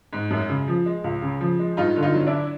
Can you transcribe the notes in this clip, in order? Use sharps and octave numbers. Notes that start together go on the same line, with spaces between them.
G#2
F#2
C#3
F3
G#3
C#2
C#3
F3
G#3
G2 D#4 F4
D3
D#4 F4
F#3
D4 E4